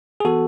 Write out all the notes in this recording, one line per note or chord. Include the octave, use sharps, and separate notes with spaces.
G#4
E3 B3 F#4 A4